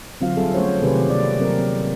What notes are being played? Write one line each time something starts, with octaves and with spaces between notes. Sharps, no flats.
D3 F#3 C4 F4 F#4 F5
G3 G#4 A4 E5
G3 A3 C#4 F#4 C5 C#5
C3 D#3 G4 G#4 B4 C5
A#3 D5
F#3 C4 A#4